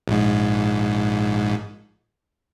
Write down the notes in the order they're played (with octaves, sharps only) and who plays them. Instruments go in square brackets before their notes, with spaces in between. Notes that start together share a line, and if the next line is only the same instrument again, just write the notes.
[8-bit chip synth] A#1 G#2